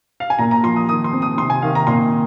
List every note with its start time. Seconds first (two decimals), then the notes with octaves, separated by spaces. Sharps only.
0.20 F5
0.30 G#5
0.39 A#2 A#5
0.51 A#5
0.63 F3 C6
0.76 D#6
0.89 D#3 D#6
1.04 C6
1.13 C4
1.22 D#6
1.37 C3 C6
1.50 G#5
1.62 D#3 F5
1.75 A#5
1.87 A#2 C6